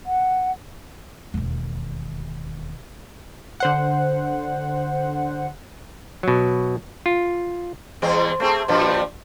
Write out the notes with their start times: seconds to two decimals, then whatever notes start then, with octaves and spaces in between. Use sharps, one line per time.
0.06 F#5
1.34 E1 D#2
3.60 D3 C5 F#5
6.23 B2 F#3
7.06 F4
8.02 E2 G#3 C4
8.40 A3 C4 G#4
8.68 G2 A#2 F3